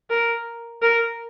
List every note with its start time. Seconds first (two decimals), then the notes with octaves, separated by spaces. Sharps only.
0.10 A#4
0.82 A#4